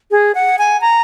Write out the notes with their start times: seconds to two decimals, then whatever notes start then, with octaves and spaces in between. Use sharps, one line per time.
0.11 G#4
0.35 F#5
0.59 G#5
0.81 A#5